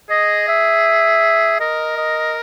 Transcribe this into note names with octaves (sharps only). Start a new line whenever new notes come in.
G#4 D#5
E5
A#4 D#5
D#5